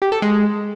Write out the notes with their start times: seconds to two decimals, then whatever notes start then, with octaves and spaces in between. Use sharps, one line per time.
0.02 G4
0.12 A4
0.22 G#3